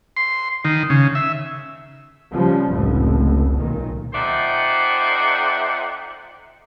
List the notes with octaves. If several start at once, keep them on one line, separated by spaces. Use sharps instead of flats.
C6
D#3
C#3
E5
C#3 F3 G3
F1 C#2 A2
B1 A#2 D#3
F2 D#4 C5 D5 E5 F#5